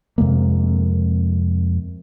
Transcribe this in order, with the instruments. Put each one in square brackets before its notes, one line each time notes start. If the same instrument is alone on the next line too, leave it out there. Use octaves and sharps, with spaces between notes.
[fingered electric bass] F2 C3 G#3 A#3